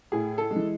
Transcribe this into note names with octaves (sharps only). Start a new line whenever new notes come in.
A2 G#4
A4
G#3
E3